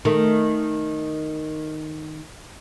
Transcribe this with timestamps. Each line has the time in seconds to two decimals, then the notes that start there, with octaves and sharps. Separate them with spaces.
0.05 D#3 A3